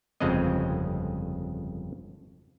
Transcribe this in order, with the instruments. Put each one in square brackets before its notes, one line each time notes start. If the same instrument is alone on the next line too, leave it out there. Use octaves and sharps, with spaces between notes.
[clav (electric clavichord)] G1 F2 C#3 G#3 C4 D#5